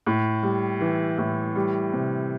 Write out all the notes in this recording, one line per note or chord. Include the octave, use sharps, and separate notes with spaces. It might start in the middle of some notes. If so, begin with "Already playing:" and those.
A2
G3
E3
A2
G3
C3